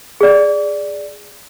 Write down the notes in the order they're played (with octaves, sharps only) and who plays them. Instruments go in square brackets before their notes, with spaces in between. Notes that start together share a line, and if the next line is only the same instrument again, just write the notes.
[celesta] G#4 D5